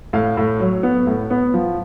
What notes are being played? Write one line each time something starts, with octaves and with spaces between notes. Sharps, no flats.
A2 F5
A2
F#3
B3
A2
B3
F3